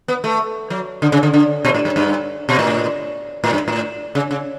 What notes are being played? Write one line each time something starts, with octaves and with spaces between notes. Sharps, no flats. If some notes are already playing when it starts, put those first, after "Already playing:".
B3
A3
F#3
D3
C#3
D3
D3
B2
A2
G2
G2
B2
A2
A2
G2
A2
C#3
C#3